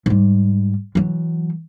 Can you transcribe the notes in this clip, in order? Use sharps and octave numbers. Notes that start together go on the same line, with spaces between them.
G#2 G3
E3 F#3